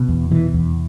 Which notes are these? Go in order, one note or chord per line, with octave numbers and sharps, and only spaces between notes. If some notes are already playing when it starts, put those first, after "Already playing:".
Already playing: B2
E2
B2 E3
E2